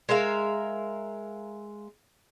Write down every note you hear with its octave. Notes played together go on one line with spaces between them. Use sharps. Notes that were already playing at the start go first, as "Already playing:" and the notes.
G#3 A#4 E5 F5